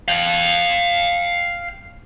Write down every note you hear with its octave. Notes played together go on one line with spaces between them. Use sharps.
F5 G5